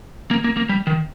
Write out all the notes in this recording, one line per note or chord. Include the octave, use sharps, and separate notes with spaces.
A#3
A#3
A#3
G3
D#3